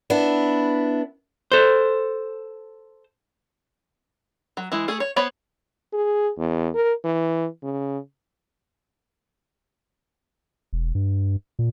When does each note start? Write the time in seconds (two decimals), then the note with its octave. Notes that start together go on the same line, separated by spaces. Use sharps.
0.10 B3 D4 E4
1.52 A4 C5
4.57 F#3
4.72 E3 G#3 E4
4.88 A3 G#4
5.00 C#5
5.16 B3 C5 C#5 B5
5.93 G#4
6.38 E2
6.75 A#4
7.05 E3
7.63 C#3
10.73 E1
10.95 G2
11.59 A#2